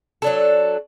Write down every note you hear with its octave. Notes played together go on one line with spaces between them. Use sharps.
F#3 D4 A4